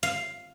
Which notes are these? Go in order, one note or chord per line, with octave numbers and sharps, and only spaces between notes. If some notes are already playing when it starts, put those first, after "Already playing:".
F5